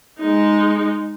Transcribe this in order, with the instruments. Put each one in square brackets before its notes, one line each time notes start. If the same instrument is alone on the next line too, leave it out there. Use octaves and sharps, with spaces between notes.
[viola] G#3 D#4